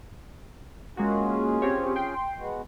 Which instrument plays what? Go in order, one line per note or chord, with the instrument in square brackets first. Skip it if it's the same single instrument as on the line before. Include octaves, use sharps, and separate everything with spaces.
[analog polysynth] G#3 A#3 F#4 [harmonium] C#4 F4 G#4
[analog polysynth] C4 G4 C#5
G5 C6
[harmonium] G#3 B3 F#4